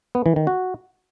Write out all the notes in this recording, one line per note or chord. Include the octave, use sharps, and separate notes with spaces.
B3
E3
D#3
F#4